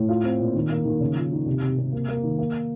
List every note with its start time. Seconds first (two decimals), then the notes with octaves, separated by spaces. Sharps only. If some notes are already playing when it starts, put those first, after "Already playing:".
Already playing: A2
0.09 F4
0.23 C4
0.40 A#2
0.55 D#3
0.70 A#3
0.85 D#3
1.00 C#3
1.16 F3
1.32 D#4
1.46 C3
1.62 C3
1.78 C3
1.92 A#3
2.08 A#3
2.23 D#3
2.39 A#3